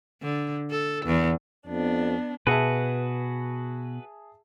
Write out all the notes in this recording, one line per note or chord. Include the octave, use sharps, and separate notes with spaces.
D3
A4
E2
F2 B3 D4
B2 F#4 G#4 B4 E5 A5